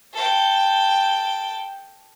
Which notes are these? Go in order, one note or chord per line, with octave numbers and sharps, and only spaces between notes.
A4 G5